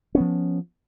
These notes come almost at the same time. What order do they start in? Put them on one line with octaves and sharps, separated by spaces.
C#4 B3 F3